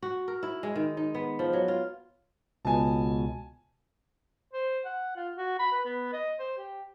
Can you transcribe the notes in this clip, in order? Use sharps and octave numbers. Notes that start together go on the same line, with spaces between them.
F#4
A#4
E4
G#3
D#3
D#4
B3
F3
F#3
F4
C#2 B2 G#5 A5
C5
F#5
F4
F#4
B5
B4
B3
D#5
C5
G4